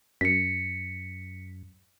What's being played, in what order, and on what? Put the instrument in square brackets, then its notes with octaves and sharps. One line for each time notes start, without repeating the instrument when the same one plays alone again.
[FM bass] F#2 [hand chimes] B6 C#7